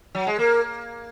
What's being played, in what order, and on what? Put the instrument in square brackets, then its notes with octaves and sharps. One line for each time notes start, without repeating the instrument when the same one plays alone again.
[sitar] F#3
G#3
[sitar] A#3 [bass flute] A#4